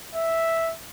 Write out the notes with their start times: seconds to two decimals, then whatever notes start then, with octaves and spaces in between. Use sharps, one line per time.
0.15 E5